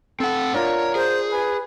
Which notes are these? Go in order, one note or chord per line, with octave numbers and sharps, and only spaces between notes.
C4 A4 F#5
D4 F4 A#4 C#5
G#4 C5
B4 G#5